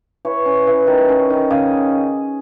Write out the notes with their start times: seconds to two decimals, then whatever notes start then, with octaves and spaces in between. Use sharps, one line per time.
0.25 E3 C#5
0.45 C#4
0.67 E3
0.87 D#3
1.09 C#4
1.30 D#3
1.50 C#3 D#5